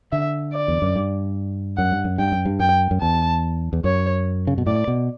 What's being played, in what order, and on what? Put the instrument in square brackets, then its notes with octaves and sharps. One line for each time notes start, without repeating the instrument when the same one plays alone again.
[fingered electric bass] D3 [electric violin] E5
[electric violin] D5
[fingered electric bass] E2
F#2
G2
[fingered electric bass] F#2 [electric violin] F#5
[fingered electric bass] G2
F#2
[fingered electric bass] G2 [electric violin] G5
[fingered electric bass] F#2
G2
[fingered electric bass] F#2 [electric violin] G5
[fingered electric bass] F#2
[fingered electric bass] E2 [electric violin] A5
[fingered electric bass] E2
[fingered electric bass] F#2 [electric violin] C#5
[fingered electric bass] C#3
B2
[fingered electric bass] A2 [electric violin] D5
[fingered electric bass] B2